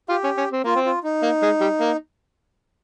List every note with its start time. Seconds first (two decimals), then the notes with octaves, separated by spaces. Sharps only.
0.09 F4 G4
0.24 C#4
0.38 C#4
0.52 C4
0.64 A#3 F4
0.75 C4
0.86 F4
1.04 D#4
1.23 A#3
1.43 G#3
1.61 G3
1.81 A#3